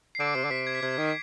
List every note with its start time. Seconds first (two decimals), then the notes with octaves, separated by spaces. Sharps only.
0.15 C7
0.19 D3 D6 D7
0.35 C3 C7
0.45 D3
0.51 C3 B6
0.67 G#6
0.75 B6
0.82 C3 G#6
0.98 D#3